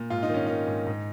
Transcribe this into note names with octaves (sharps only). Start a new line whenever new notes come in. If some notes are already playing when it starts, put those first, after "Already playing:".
Already playing: A#2
G#2 F4
D#4
D#3 C#4
D#3 D#4
G#2
G#2